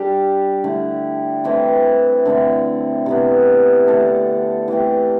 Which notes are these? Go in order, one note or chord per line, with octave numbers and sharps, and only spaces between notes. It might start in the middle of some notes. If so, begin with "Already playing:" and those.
Already playing: G3 D4 G4
D3 A3 E4
E3 A3 C4 E4
D3 A3 C4
C3 E3 B3
D3 A3 D4 A4
E3 A3 C4 G4